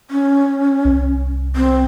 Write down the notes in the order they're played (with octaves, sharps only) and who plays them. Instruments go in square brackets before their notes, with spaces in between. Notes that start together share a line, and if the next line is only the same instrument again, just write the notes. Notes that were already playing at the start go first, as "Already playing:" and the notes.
[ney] C#4
[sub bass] C2
[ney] C4